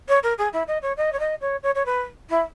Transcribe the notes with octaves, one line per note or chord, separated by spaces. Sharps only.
C#5
A#4
G#4
E4
D#5
C#5
D#5
C#5
D#5
C#5
C#5
C#5
B4
E4